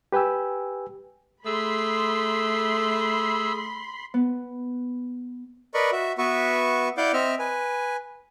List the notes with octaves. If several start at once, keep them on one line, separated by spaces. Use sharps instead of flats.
G4 B4 G5 G#5 E6
A3 G#4 B5 C6 E6
B3
A#4 B4 D5 D#5 B5 C#6
F#4 E5
B3 F#4 B4 E5 C#6
E4 D5 F5 F#5 D6 G6
C4 D#5 E5 F6
B4 G#5